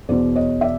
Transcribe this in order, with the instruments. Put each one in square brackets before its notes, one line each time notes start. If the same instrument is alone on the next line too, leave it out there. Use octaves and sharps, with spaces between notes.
[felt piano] E2 B2 C5 D5
C#5 D#5
D5 E5